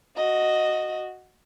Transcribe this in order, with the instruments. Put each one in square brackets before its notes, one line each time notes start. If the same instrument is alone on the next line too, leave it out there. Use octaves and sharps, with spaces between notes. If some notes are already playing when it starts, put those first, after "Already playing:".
[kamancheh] F#4 D#5